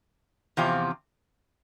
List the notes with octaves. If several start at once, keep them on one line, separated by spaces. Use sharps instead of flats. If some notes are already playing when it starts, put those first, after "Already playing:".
E2 C3 F3 C4 F4